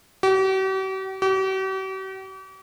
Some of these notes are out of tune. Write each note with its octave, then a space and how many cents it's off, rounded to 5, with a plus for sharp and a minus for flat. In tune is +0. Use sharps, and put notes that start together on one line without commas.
G4 -45
G4 -45